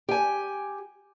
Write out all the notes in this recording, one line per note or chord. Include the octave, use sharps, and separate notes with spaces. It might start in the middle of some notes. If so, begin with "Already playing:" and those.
G4 G#5